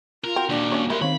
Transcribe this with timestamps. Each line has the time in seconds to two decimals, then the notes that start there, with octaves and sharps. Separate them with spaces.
0.24 F4 A#4
0.36 C4 F#4
0.49 D#2 A#2 D4
0.72 C#4 C#5
0.90 F3 G3 A3 E4 A#4 C6
1.02 D#3 C4 C#5 F5 B5